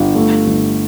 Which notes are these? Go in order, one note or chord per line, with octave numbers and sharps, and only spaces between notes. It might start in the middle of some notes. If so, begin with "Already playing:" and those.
Already playing: G1
A3
G1